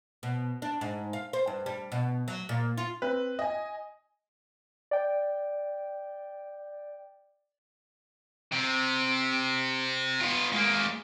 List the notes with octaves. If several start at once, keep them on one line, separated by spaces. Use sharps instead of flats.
B2
D4
G#2
F5
C5
G2
G3
B2
F#3
A#2
F4
C4 B4
D#5 G#5
D5 G5
C3
B3 F4
G#3 A#3